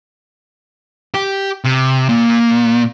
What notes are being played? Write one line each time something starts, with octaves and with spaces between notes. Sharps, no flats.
G4
C3
A#2